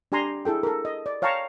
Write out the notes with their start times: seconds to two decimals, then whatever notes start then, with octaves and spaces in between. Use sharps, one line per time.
0.12 D4 G4 G#5 A#5 C6
0.45 E4 G#4 A4 G5
0.63 A4 A#4
0.85 D#5
1.06 D5
1.22 C#5 F5 G5 A5 A#5 C#6